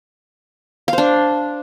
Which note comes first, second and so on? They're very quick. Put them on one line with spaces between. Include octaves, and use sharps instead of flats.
F5 C5 D4